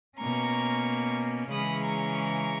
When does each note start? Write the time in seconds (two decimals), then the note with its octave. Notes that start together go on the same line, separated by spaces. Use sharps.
0.18 B2 A#3 C#4 A#5 C#6
1.50 C#3 E3 G#3 C#4 B5 D#6
1.84 A#5 C#6